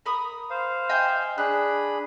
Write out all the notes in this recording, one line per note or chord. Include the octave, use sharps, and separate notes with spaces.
A#4 B5 D#6
C5 F5
D#5 G5 G#5
D4 G#4 B5 F#6